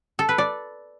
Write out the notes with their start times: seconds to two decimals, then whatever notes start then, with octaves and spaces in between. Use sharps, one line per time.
0.19 A4
0.29 B4
0.38 D5